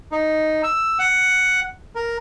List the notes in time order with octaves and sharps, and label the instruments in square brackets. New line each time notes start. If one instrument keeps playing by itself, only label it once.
[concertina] D#4
E6
F#5
A#4